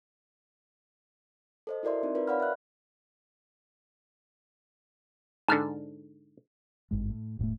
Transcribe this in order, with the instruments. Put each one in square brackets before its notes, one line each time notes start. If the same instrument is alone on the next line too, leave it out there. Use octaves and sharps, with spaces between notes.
[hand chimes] A4 C5 D#5
E4 F#4 A#4 D5 E5 C6
C4 D#4 A#4
F4 A#4 B4 D5
C#5 D5 F5 F#5 B5 F6
E5 F#6
[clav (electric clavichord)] G#2 D3 [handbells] A5 F6 A6
[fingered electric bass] G#1 G2 G#3
A2
E1 A2 G#3 A3